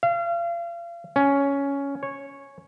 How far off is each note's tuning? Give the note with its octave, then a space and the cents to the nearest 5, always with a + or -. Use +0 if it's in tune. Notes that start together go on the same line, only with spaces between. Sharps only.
F5 -35
C#4 +10
C#5 -10